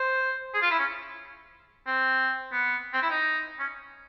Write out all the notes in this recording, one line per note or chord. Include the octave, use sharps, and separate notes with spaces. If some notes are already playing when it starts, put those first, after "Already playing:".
Already playing: C5
G#4
F4
E4
C#4
C4
B3
C4
E4
D#4
C#4